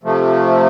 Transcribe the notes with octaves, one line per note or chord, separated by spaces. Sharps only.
C3 F3 A3